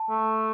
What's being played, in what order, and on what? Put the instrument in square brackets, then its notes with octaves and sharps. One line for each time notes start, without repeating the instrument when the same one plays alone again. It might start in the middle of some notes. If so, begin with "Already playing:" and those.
Already playing: [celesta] A5
[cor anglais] A3